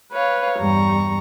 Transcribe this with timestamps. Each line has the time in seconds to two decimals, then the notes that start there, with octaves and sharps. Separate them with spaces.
0.12 B4 C#5 F5
0.58 E2 G2 G3 A#5 C#6